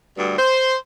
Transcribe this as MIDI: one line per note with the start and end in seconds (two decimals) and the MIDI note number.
0.17 0.34 38
0.17 0.34 43
0.37 0.74 72